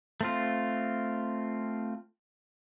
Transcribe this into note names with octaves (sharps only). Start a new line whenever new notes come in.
A3 C4 F4